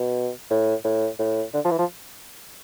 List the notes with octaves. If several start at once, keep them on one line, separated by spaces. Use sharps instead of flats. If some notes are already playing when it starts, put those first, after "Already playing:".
Already playing: B2
A2
A2
A2
D3
F3
E3
F3